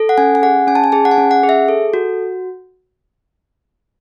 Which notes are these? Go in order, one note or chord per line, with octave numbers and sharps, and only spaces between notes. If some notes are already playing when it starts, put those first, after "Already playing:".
Already playing: A4
F#5
C#4 G#5
G#5
G#4 F#5
C#4 G#5
A5
G#5
G#4 A5
F#5
G#5
C#4
F#5
G#4
E5
A4
F#4